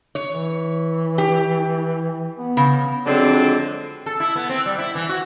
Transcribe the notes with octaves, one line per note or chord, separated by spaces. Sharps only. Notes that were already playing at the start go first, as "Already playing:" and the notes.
C#5
E3
G4
B3
C#3
F2 D3 F#3 G#3 C4 D4
A4
E4
B3
C4
G3
E4
E3
F#4